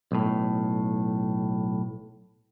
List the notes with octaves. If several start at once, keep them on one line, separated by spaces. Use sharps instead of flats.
B1 A2